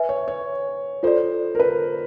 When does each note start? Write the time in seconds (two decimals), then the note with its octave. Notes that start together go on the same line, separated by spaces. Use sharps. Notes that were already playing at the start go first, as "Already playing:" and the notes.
Already playing: B4 E5 G#5
0.09 C#5
0.28 C#5
1.03 F4 A4 C5 D5
1.55 A#4
1.60 B4